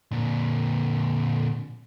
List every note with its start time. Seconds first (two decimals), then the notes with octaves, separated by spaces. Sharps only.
0.11 A#2 D3